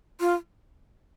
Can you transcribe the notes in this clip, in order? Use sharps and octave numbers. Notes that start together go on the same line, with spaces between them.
F4